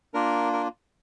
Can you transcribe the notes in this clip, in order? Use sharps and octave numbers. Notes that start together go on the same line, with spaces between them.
A#3 D4 F4 A#4
A#4